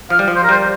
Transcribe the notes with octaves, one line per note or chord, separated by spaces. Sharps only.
F3 F5
G3
F3
C5
A#4
G3 C5